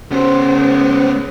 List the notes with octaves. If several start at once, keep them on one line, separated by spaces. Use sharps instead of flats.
C#3 B3 C5